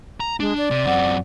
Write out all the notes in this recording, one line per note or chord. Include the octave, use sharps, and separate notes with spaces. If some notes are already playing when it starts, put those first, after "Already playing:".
A#5
G#3 D4
D5
C3
F#2 C4 F#5